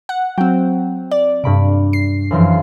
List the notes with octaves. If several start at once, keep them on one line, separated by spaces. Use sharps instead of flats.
F#5
F#3 C4 G5
D5
G2 C3 B5 D7
C7
F#2 E3 F3